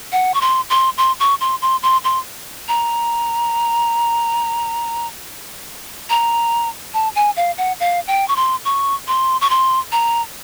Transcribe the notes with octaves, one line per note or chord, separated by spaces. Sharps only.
F#5
C#6
C6
C6
C6
C#6
C6
C6
C6
C6
A#5
A#5
A5
G#5
F5
F#5
F5
G5
C#6
C6
C#6
C6
C#6
C6
A#5